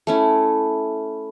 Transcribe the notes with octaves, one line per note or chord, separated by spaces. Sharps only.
A3 C#4 E4